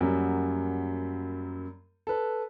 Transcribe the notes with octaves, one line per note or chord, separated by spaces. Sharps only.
F#2 F#3 G3 A#3
A4 B4